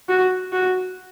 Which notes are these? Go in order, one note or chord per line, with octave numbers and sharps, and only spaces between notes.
F#4
F#4